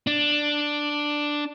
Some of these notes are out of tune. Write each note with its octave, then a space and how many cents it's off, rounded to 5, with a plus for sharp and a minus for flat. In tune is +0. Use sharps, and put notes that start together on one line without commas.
D4 +5